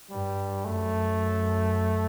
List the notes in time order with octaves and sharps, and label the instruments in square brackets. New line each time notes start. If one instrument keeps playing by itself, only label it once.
[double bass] G2 [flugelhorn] G3
[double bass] F#2 [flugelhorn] A3